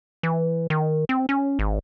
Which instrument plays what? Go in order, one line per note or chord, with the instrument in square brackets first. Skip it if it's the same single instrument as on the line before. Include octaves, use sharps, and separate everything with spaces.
[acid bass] E3
D#3
C4
C#4
G#1